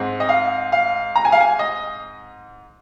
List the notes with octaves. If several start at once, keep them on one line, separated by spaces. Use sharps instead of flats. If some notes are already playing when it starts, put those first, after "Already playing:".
Already playing: G#2 G#3 C4
D#5
F5
F5
A#5
G#5
F5
G#5
D#5